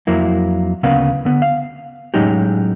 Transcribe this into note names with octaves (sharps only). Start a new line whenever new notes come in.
F2 F#3 A#3 E4
D2 C#3 A#3 B3 F5
D3 B3
F5
A2 F#3 G#3 C#4 D#4 G4